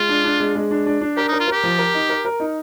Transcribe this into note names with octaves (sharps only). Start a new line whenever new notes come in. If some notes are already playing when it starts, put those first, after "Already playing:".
Already playing: G#3 F4
D4
D4
G#3
G#3
D4
D4
D4
G4 A#4
D#4
A#4
F4
G4 A#4
F3
A#4
D#4
A#4
A#4
D#4